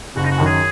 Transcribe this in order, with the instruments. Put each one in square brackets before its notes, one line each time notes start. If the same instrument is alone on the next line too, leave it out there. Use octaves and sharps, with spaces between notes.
[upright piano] F#1 [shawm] F#4
[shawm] D#4
F#4
[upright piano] F#2 D#3
[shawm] G#4